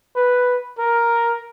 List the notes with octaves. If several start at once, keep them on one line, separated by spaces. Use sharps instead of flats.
B4
A#4